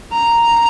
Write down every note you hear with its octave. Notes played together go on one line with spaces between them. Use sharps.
A#5